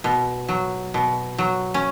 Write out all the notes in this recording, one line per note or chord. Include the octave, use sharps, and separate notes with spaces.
B2
F#3
B2
F#3
C#4